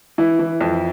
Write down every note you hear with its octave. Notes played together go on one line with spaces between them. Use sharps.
E3 E4
E3
F2